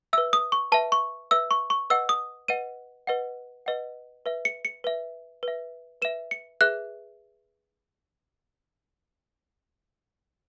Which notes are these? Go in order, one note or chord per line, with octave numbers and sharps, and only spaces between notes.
B4 E5 E6
D#6
C#6
B4 E5 A5
C#6
B4 E5 E6
C#6
C#6
B4 D#5 F#5 E6
D#6
B4 D#5 F#5 D#7
B4 D#5 F#5
B4 D#5 F#5
B4 E5
C#7
C#7
B4 E5
B4 E5
B4 E5 E7
C#7
G#4 B4 E5 F#6